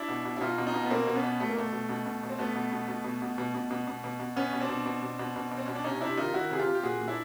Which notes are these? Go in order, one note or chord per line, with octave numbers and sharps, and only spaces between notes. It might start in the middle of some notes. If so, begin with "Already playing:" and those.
Already playing: D4 E4
B2
B2
E4
B2 D#4 F4
B2
D#4 F4
B2
B3
B2 A#3 C4
B2
B3 C#4
B2
B2 A3
A#3
B2 A3
B2
B2
B2
B2
C4
B2 A3 B3
B2
B2
B2
B2
B2
B2
B2
B2
B2
B2
B2
B2 B3 C#4
B2
C4 D4
B2
B2
B2
B2
B2
B2
C4
B2 C#4
D4
C3 C#4 D#4
C3 D4 E4
D#3 D#4 F4
D#3 E4 F#4
C3 G#4
F4 G4
C3
G4
A#2 F#4 G#4
A#2
D4 E4